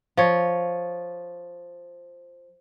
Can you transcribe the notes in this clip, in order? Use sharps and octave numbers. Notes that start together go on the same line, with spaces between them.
F3 C#5